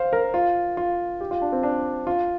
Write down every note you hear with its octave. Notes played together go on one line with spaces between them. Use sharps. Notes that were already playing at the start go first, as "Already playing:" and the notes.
Already playing: C5 F5
A#4
F4
F4
G4
F4
D4
C4
D4
F4